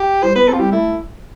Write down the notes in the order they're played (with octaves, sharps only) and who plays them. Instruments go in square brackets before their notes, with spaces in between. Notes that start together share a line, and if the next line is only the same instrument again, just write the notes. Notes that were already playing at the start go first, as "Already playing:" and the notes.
Already playing: [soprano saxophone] G4
[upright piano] G3 [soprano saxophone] C5
[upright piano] B3 [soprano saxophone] B4
[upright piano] C4 [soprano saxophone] A4
[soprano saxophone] F4
[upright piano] G3 [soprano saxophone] G4
[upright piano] A3 [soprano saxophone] E4